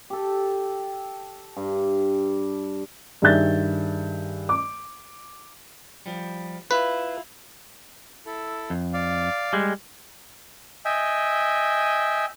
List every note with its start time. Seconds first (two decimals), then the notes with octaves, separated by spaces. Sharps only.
0.10 G4 A4
1.57 G2
3.22 G2 D#3 G#4 E5 G6 A6
4.49 D6
6.06 F3 G3
6.71 E4 F4 B4
8.26 E4 A4
8.70 F2
8.93 D5 F5
9.53 G3 G#3
10.85 D#5 E5 G5 G#5